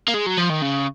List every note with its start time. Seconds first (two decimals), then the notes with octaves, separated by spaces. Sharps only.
0.08 A#3
0.14 G#3
0.27 F#3
0.38 F3
0.50 D#3
0.62 C#3